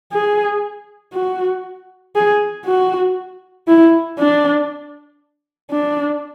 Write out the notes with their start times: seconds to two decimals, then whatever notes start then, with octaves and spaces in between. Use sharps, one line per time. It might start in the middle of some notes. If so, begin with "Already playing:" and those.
0.12 G#4
1.13 F#4
2.16 G#4
2.66 F#4
3.68 E4
4.18 D4
5.71 D4